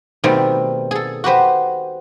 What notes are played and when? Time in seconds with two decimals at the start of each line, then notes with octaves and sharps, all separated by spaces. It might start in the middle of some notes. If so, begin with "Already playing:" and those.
0.24 B2 D#3 G3 A3 C4
0.91 G#4 A4
1.24 F#4 G4 B4 C5